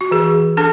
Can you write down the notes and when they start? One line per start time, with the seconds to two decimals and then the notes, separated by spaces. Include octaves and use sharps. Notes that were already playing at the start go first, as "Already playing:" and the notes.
0.01 F#4
0.11 E3 G#4
0.57 D4 A4